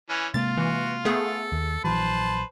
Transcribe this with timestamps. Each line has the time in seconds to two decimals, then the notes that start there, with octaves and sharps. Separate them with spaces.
0.09 E3 C#4
0.34 C3 G#3 A#3 F4 A6
0.57 E3 F#4
1.05 A3 B3 G#4 A4
1.52 D#2
1.84 A#1 E3 F#3 B4 C5 A5